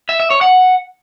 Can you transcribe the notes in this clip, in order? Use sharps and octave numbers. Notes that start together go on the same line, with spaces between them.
E5
E5
C#5
F#5